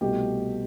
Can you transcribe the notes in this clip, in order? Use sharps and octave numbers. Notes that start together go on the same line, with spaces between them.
C2 B2 A3 G4